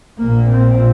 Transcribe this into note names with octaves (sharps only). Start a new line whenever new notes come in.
A#1 A#2 A#3
C4